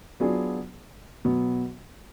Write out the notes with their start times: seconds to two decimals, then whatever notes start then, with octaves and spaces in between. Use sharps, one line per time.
0.20 F#3 B3 D4 F4 G#4
1.25 B2 F#3 B3